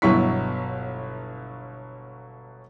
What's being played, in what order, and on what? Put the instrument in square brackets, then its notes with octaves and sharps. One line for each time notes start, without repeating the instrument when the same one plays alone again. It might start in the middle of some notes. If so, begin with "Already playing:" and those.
[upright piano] G1 B2 F#3 E4 C#6 B6